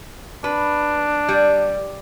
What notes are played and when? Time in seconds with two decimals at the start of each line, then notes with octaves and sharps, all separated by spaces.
0.44 D4 B4
1.29 G3